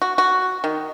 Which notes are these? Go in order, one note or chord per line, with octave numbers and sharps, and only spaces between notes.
F#4
F#4
D#3